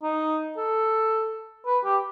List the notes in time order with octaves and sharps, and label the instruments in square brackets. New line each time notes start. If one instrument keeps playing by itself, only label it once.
[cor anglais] D#4
A4
B4
G4